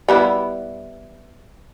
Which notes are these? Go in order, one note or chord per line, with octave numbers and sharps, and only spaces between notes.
G3 B3 E4